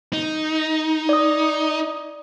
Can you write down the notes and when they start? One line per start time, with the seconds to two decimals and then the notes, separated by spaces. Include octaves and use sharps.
0.13 D#4
1.09 D5 D#6